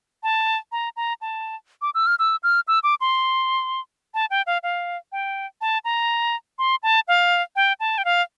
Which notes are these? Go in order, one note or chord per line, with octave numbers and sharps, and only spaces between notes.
A5
A#5
A#5
A5
D6
E6
F6
E6
F6
E6
D6
C6
A5
G5
F5
F5
G5
A5
A#5
C6
A5
F5
G5
A5
G5
F5